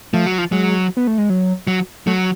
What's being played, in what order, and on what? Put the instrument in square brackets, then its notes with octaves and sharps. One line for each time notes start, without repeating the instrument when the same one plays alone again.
[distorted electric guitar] F3 [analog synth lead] A3
[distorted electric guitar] F#3
F3
[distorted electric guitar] F#3 [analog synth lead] G#3
[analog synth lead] B3
A3
G#3
F#3
[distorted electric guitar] F#3
[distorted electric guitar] F#3 [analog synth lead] A3